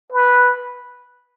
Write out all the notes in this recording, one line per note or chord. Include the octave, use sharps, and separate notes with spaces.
B4